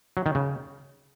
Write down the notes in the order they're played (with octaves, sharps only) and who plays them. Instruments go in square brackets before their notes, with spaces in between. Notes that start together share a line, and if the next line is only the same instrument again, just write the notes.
[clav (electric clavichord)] F#3
D#3
C#3